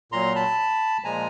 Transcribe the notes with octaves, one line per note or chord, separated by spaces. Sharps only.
A#2 F#3 A#5 C6
A5 B5
A#2 F3 G#3 G#5 A#5